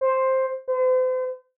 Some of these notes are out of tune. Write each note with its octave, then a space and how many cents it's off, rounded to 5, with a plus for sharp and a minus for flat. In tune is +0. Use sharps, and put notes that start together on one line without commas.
C5 +5
C5 -40